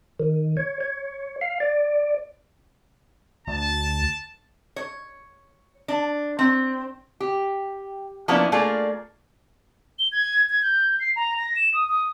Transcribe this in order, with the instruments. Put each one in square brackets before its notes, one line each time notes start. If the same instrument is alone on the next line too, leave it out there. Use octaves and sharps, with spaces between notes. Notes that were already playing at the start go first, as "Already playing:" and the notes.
[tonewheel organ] D#3
C#5
C#5
F5
D5
[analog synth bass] D2 [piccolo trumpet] A5
[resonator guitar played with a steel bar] C#5
D4
C4
G4
F3 A#3 B3 C#4 D4 E4
A3 A#3 D4 F4 G#4
[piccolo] G7
G#6
G#6
G6
C7
A#5
A#6
E7
D#6
D#6